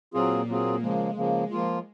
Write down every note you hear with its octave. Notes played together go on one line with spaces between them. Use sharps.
A#2 F#3 A#3 C4 F4 G#4
F#3 C4 F4 G#4
C#3 F3 G#3 A#3
C#3 F3 A#3
F3 G#3 A#3 F4